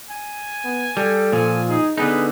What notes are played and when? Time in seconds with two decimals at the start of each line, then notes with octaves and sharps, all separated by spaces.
0.11 G#5
0.64 B3
0.97 G3 A4
1.32 A#2 F3 G#5
1.68 D#4 G#4
1.98 D3 B3 D#4 G#4 B4